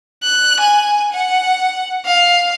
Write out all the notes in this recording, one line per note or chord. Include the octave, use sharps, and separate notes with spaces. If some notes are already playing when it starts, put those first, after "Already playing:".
F#6
G#5
F#5
F5